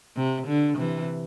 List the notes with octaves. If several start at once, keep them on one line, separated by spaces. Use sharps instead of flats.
C3
D3
C3 E3